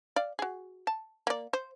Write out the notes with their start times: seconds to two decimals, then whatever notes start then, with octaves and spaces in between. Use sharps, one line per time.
0.16 D5 F5
0.39 F#4 G#4
0.87 A5
1.27 A#3 D5
1.53 C5